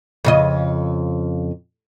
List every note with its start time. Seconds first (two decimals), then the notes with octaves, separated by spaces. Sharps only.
0.25 F2 C#3 D#5